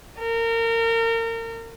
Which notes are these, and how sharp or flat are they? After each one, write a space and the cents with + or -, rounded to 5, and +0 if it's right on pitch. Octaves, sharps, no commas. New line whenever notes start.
A#4 -30